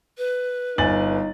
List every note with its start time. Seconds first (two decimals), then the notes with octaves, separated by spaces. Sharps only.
0.18 B4
0.78 G1 D#4 G#5 A6 F#7